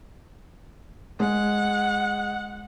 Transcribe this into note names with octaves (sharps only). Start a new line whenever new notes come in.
G#3 F#5